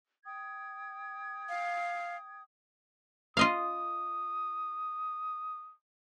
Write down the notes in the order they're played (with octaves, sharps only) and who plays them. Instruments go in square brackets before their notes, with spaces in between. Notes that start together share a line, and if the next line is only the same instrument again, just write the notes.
[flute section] G5 D#6 G#6
[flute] F5
[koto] F4 D#5 F5 [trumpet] D#6